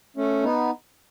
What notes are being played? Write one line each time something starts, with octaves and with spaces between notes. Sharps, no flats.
A3 C#4
B3 D#4